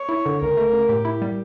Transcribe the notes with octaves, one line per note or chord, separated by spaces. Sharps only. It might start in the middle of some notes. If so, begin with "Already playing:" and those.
Already playing: C#5
E4
D3
C#2 A#4
A3
C#3
A2 G4
E4
G3